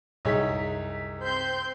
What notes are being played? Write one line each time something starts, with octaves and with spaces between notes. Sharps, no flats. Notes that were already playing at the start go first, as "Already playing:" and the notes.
C2 F#2 D#4 G#4 C#5 B6
C4 C6 G6